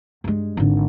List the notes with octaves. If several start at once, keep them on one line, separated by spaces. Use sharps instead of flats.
G2 G#3
G#1 D3